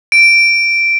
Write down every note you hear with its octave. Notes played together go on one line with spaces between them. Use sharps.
D7